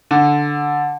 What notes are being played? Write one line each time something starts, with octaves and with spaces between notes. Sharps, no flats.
D3